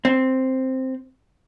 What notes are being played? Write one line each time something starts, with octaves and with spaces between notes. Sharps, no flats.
C4